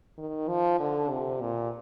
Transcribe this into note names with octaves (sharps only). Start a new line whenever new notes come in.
D#3
F3
D3
C3
A#2